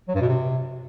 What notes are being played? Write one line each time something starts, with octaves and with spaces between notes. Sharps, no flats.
F#3
G2
B2
C3